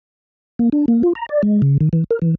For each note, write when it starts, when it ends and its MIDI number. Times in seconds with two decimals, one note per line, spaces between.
0.59 0.69 58
0.72 0.86 62
0.88 1.02 58
1.03 1.13 65
1.15 1.26 82
1.29 1.42 74
1.43 1.61 56
1.62 1.78 49
1.81 1.89 51
1.93 2.04 52
2.11 2.19 70
2.22 2.35 52